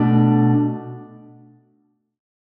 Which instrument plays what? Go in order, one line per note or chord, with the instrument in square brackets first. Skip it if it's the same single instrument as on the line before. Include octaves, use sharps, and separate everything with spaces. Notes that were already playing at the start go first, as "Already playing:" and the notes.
Already playing: [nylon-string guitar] B2 A3 D4